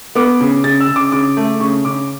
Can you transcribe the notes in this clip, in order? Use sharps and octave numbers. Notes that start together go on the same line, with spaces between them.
B3 D6
C#3
C#3 A6
E6
C#3
D6
C#3 D6
A3
C#3 C#6
C#3 D6